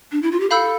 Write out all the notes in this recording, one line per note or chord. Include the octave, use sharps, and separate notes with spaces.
D4
E4
F4
G4
A4 F5 B5 E6 G6